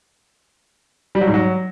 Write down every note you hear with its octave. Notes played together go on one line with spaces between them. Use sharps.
G3
F#3
G#2
F#3